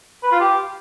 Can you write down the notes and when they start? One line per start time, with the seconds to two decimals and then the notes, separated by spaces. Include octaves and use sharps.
0.23 B4
0.32 F4
0.40 G4